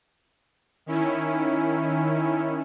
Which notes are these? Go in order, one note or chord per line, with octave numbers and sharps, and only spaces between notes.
D#3 C#4 E4